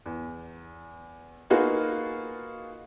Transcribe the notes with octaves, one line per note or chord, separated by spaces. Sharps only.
E2
A#3 B3 D#4 F4 F#4 G#4